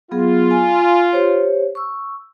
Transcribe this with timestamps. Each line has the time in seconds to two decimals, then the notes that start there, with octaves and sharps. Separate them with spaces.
0.11 F#3 B3 F4 G#4
0.51 G#5
1.13 G4 C5 C#5
1.75 C#6 E6